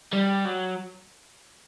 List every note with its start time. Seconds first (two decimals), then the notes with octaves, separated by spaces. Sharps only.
0.13 G3
0.45 F#3